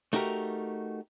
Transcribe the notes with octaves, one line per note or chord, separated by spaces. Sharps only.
A3 D#4 F#4 G4 A#4